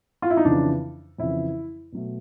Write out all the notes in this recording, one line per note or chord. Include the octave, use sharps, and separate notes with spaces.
F4
E4
D#4
F2 C#3 E3 D4
F2 C#3 E3 E4
B2 F#3 A3